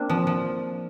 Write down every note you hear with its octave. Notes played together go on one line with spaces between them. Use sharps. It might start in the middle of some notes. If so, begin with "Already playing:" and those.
Already playing: A#3 C4 D4
F3
F3